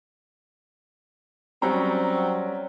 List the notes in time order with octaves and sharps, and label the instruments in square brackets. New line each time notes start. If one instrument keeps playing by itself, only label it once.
[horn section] F#3 C4 [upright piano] G3 C#4 A#5